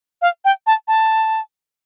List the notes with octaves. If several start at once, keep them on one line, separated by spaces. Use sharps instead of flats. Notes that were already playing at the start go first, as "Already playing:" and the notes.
F5
G5
A5
A5